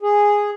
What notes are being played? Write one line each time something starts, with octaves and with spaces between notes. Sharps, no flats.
G#4